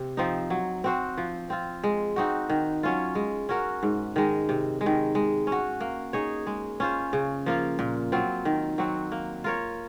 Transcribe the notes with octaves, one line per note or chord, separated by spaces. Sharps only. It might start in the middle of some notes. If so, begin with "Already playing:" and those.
Already playing: C3
F3 C4 D#4
F#3
C4 F#4 C5
F3
C4 F4
G#3
C4 D#4 F#4
D#3
F#3 C#4 F4
G#3
C#4 F#4 A#4
G#2
D#3 G#3
C3
G#3
D#3
G#3
C#4
F#4
A#3
D#4 G#4 C#5
G#3
C#4 F4 C5
C#3
F3 A#3 F4
A#2
F#3 C4 F4
D#3
F#3 C4 F#4
A#3
F4 A#4 C#5